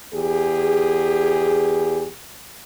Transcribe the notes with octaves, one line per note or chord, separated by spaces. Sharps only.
E2 G4 G#4